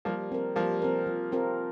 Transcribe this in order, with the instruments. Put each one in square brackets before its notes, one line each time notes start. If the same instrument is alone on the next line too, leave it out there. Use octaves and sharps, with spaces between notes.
[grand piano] F3 A#3 [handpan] G3
[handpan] C4 A#4
[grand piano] F3 A#3 [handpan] G3
[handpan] C4 A#4
F3
C4 F4 A#4